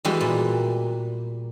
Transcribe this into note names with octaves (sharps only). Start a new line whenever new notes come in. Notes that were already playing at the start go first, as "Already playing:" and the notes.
E3 G3 G#3 B3 F#4
A#2